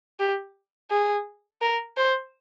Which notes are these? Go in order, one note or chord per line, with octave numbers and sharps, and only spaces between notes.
G4
G#4
A#4
C5